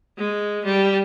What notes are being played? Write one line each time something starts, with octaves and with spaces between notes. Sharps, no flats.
G#3
G3